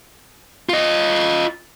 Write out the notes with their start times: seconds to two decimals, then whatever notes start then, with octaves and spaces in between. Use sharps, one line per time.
0.69 F4 D#5